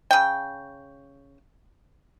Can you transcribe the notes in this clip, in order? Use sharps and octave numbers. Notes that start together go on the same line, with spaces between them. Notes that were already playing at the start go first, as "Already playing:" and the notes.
C#3 G5